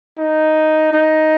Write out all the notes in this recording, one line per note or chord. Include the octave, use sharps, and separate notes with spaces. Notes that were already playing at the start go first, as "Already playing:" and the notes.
D#4
D#4